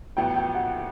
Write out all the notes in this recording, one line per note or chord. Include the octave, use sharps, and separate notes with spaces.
A1 A2 F#3 B3 G5
G5
F#5